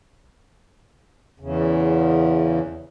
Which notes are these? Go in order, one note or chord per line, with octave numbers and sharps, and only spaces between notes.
E2 C#3